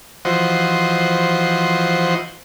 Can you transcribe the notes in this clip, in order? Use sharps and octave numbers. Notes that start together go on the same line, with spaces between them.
E3 F3 F#4 C5 D#5